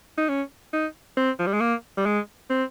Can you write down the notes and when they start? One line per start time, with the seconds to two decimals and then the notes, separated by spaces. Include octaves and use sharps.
0.18 D#4
0.29 C#4
0.73 D#4
1.17 C4
1.39 F3
1.47 G3
1.53 G#3
1.61 A#3
1.97 G3
2.06 G#3
2.50 C4